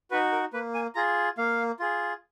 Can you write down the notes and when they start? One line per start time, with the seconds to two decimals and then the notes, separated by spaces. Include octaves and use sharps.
0.11 D#4 F#4 B4
0.32 A#4
0.53 A#3 B4
0.74 G#5
0.95 F4 G#4 A#5
1.38 A#3 F5
1.79 F4 G#4